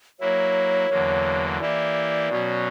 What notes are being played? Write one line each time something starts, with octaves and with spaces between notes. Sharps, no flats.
F#3 A#3 E4 C#5
E2 D3 F#3 A#3
E3 A#3 E4 G4 D5
B2 F#3 C#4